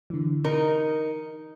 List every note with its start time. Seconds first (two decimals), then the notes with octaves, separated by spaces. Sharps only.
0.10 D3 E3
0.44 D#4 A#4 C#7